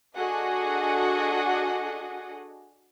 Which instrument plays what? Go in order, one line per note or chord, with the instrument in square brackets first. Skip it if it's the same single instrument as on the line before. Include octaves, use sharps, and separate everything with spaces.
[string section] D4 F#4 G#4 A4 D#5 F#5